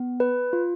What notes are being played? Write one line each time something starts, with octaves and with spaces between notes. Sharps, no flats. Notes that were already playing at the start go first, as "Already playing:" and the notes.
Already playing: B3
B4
F4